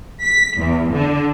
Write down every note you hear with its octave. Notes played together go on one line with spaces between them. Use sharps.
B6
E2
D3